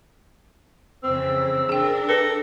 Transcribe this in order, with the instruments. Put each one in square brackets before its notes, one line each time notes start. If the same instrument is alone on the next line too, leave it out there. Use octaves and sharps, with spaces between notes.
[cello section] F2 C#3 E3 [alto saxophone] C4 [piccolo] E6
[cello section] D4 A#4 [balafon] G#4 G5
[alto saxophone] A4 [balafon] B4 [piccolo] A#6